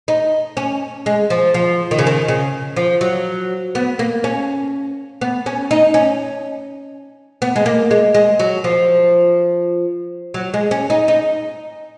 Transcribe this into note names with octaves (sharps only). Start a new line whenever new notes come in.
D#4
C#4
G#3
F3
F3
D#3
C#3
D#3
C#3
F3
F#3
B3
A#3
C#4
B3
C#4
D#4
C#4
B3
G#3
A#3
G#3
G#3
F#3
F3
F#3
G#3
C#4
D#4
D#4